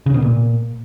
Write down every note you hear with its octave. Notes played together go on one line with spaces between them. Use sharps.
C#3
B2
A#2